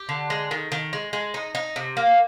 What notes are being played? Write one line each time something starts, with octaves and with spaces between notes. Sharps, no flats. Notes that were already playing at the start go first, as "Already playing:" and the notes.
Already playing: G4
D3
G#3
D#3
D#3
G#3
G#3
D#4
D#4
C3
A#3